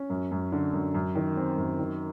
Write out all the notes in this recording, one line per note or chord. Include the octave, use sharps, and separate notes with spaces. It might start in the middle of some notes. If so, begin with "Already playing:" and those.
Already playing: C#4
F#2
F#2
D3
F#2
F#2
D#3
C4
F#2
D#3